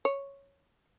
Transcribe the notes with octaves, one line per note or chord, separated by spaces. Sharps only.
C#5